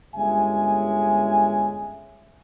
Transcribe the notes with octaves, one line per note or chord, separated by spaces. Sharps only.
G1 G#3 C#4 E5 G#5